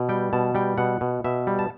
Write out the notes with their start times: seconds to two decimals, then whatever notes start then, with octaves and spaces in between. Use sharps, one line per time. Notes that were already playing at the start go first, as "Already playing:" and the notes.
Already playing: B2
0.09 G3 G5
0.33 B2 A5
0.55 G3 G5
0.78 B2 F#5
1.01 B2
1.24 B2 E5
1.47 G3
1.59 A5